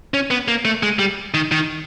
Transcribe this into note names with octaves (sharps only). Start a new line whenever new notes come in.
C#4
B3
A#3
A3
G#3
G3
D#3
D#3